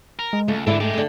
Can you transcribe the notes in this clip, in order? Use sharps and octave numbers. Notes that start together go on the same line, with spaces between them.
A#4
G#3
C#2 A3
G#2 D3 E3 D4 E4 A4
G#3 A3 G4
D3 A3